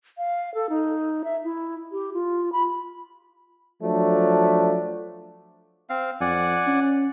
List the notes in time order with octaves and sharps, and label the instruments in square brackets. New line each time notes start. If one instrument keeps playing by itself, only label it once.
[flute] F5
A4
D#4
E5
E4
G4
F4
B5
[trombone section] F3 F#3 A3 D4
[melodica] C4 F5
[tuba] F2 [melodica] D5 F#5 G#5
[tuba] C#4